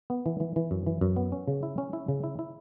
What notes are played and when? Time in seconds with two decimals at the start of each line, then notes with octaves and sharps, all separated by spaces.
0.10 B3
0.26 E3
0.40 E3
0.56 E3
0.71 F#2
0.86 E3
1.01 F#2
1.16 B3
1.32 C#4
1.48 C#3
1.63 E4
1.78 C#4
1.93 E4
2.08 C#3
2.23 E4
2.39 E4